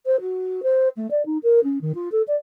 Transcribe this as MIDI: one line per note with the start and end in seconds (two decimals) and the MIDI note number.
0.06 0.20 72
0.20 0.61 66
0.63 0.88 72
0.97 1.09 57
1.10 1.25 74
1.25 1.38 63
1.43 1.60 70
1.64 1.81 61
1.81 1.92 51
1.95 2.09 65
2.12 2.22 69
2.27 2.35 74